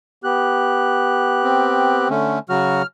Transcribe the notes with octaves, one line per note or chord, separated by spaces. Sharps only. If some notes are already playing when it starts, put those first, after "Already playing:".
B3 G4 F#6
C4
D3 A3 C#4
C#3 F#3 F#4 F6